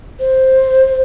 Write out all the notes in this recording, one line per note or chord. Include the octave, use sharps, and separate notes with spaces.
C5